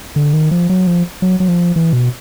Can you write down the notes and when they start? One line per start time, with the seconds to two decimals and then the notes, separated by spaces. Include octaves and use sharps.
0.16 D3
0.33 D#3
0.51 F3
0.69 F#3
0.87 F3
1.22 F#3
1.40 F#3
1.48 F3
1.76 E3
1.93 B2